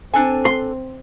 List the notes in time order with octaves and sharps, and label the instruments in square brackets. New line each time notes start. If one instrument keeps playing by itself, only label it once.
[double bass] C4 [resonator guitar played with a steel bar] D4 A4 G#5
[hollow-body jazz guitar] C6